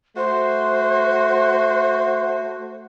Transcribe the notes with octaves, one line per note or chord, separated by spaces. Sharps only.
A3 F#4 C5